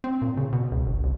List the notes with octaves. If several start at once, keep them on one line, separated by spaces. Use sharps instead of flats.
C4
A#2
C#3
B2
C#2
G1
C2